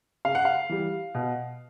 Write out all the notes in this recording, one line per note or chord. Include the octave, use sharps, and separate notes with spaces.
C#3 F5
F#5
F5
E3 G3
B2